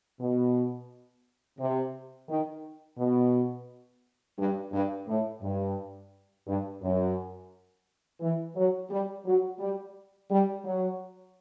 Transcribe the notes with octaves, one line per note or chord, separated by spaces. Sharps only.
B2
C3
D#3
B2
G2
G2
A2
G2
G2
F#2
E3
F#3
G3
F#3
G3
G3
F#3